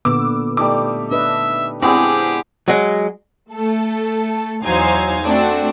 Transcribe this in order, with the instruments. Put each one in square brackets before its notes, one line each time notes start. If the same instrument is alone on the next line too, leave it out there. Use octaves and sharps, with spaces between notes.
[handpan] A#2 D3 B3 [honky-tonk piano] D6 E6
[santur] G3 A3 D#4 [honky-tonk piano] D6
[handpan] D4 B4 D#5 [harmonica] E5
[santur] G#3 B3 E4 [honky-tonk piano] C4 [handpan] D4 [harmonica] G4 G#4
[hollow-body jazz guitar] F#3 G#3
[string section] A3 A4
E2 F#3 D#4 C5 F5 G#5
A3 C4 D4 F#4